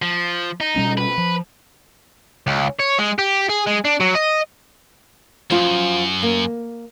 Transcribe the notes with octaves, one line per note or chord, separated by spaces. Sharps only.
F3
D#4
B2 G3 C#4
B4
F3
C#2
C#5
G#3
G4
G#4
G#3
D4
F#3
D#5
F#2 F3 F4
A#3